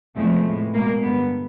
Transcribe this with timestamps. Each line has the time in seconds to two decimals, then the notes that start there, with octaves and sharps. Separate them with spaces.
0.15 E2 C3 F3 G#3 A3
0.46 A2 E3 G#3
0.74 B2 G#3 A#3
1.03 G2 D3 G3 B3